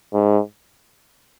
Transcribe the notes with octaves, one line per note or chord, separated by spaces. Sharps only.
G#2